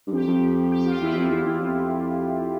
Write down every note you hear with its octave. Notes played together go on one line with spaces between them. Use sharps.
G2
F2 G4
F2
G4
F4
E2 E4
F2
E2
E2
F2